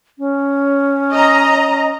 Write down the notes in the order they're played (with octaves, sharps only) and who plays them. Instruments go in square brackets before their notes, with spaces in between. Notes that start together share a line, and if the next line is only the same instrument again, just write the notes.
[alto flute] C#4
[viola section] D#5 A#5